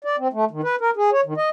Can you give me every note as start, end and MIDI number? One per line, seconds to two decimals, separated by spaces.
0.04 0.16 74
0.18 0.28 60
0.33 0.45 57
0.51 0.61 51
0.63 0.75 71
0.81 0.90 70
0.96 1.10 68
1.12 1.21 73
1.25 1.34 51
1.37 1.49 75